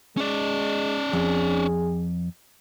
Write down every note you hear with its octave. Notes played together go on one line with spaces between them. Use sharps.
G#3 C#4 D5
F2 G#4